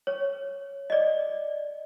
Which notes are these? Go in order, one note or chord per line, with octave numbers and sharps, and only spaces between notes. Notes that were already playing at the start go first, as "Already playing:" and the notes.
C#5
D5 D#5